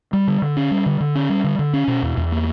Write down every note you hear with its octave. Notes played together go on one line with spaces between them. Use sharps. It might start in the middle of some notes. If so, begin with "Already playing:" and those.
G3
D3
D3
C#4
G3
D3
D3
C#4
G3
D3
D3
C#4
B2
E2
E2
A#3